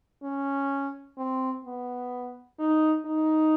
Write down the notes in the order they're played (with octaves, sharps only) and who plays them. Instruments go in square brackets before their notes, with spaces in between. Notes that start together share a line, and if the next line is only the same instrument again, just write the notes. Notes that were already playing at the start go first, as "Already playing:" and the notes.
[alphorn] C#4
C4
B3
D#4
D#4